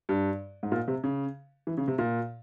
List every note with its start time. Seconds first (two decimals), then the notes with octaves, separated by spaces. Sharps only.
0.09 G2
0.63 G#2
0.72 A#2
0.88 C3
1.04 C#3
1.67 E3
1.78 C#3
1.88 C3
1.98 A#2